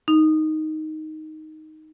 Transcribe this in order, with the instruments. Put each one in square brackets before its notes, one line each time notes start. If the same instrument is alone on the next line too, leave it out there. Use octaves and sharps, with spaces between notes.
[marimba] D#4